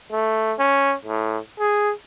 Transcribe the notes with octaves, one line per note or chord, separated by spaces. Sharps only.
A3
C#4
A2
G#4